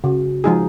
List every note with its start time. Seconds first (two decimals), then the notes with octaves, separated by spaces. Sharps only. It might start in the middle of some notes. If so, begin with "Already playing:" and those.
0.04 C#3 F#4
0.44 F3 G#3 D#4 G#4